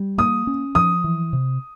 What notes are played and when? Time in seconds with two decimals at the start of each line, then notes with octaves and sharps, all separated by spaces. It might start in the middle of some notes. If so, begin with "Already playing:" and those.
Already playing: G3
0.18 A#3 D#6
0.47 C#4
0.75 F3 D#6
1.04 E3
1.33 C3